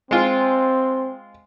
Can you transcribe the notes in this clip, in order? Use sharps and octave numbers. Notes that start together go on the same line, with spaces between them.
G#3 C4 F4